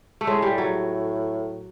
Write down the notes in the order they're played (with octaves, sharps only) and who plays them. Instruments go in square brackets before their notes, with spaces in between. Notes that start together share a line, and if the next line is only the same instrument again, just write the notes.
[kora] A3
[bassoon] A2 [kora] G#3
[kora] G3
F#3